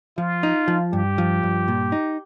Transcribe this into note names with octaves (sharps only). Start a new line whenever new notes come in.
F3 F4
D#4
F3
G2 G4
F3
G2
A#2
D#4